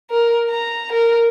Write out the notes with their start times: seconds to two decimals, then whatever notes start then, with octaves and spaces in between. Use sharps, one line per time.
0.11 A#4
0.50 A#5
0.93 A#4